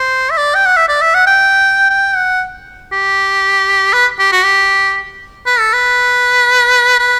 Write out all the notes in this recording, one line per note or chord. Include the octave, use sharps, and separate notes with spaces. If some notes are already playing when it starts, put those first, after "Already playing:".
Already playing: C5
E5
D5
G5
F#5
E5
D5
E5
F#5
G5
G5
F#5
G4
B4
G4
F#4
G4
B4
A4
B4
B4